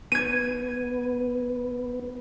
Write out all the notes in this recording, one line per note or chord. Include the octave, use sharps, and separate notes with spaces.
B3 G#6 D#7